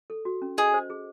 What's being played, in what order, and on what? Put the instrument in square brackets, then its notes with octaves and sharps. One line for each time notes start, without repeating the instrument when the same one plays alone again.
[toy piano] A4
F#4
C#4
[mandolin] G#4 [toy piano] D#5
[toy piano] C5
G#4